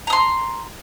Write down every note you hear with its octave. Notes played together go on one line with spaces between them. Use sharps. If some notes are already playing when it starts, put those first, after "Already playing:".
A#5 C6 D#6